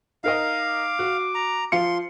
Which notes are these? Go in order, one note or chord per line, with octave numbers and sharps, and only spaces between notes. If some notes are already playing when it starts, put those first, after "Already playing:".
D#4 A#4 D#5 F5
D6
F#4
A#5
F3 F4 C6 C#7